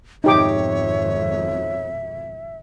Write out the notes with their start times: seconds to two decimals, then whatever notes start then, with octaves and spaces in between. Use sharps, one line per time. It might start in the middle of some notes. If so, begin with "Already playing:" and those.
0.24 G#1 F2 B2 D#4 G4 C#5 E5 D6